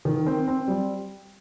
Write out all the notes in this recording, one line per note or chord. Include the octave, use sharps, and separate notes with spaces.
D#3
C4
C4
G3